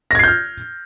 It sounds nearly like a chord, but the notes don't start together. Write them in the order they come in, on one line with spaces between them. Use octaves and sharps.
A#6 G#6 C7 G6 F6